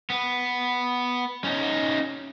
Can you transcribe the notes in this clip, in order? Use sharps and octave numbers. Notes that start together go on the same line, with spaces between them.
B3
C#4 D#4